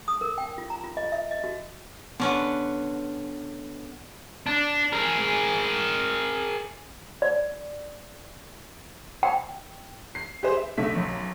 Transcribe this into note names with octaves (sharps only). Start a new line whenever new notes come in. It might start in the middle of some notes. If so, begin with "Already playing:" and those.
D#6
A#4
G5
F4
A#5
F4
D#5
E5
D#5
F#4
D3 B3 C#4 B4
D4
G#4 A#4
D5
G5
C7
G4 G#4 B4 C5
E5
B1 D3 A3 E5 B6
B1 F#2